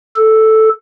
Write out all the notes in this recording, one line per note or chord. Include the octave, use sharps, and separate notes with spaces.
A4